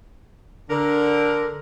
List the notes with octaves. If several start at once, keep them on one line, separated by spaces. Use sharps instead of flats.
D3 A#4